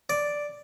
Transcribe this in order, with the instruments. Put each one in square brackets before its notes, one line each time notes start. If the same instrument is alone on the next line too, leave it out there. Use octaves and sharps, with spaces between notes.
[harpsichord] D5